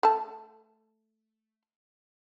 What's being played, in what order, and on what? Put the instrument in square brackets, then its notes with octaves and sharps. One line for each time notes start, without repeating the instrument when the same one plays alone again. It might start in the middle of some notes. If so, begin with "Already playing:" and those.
[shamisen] A3 A5